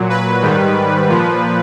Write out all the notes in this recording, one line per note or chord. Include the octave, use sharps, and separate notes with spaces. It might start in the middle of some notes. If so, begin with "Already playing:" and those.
Already playing: A#2 F#3
B4
G#2 D#3 G3
A#2 F3